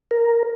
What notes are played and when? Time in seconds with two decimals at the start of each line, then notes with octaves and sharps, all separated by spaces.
0.11 A#4